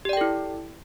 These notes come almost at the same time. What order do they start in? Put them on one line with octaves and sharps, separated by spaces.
G4 D5 G5 A4 E4